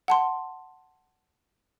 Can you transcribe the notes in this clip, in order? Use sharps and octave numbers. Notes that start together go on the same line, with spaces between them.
F#5 A5 C6